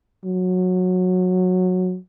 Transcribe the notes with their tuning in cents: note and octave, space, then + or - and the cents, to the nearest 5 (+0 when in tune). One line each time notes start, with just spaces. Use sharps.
F#3 -15